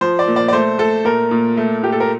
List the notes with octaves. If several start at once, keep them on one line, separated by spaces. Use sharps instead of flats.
F3 C5
D5
A#2
D5
D5
A3 C5
A3 A4
A#2 A#4
A#2
A3
A#2 G4
A4
A#4